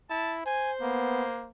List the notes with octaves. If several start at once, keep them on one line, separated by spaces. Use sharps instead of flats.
E4 A5
C5 G#5
A#3 B3